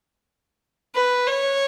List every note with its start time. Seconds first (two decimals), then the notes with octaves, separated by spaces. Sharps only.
0.95 B4
1.27 C#5